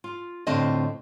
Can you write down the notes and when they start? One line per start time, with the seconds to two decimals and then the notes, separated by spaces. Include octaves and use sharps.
0.04 F4
0.47 A2 D3 C4 D4 F4 D#5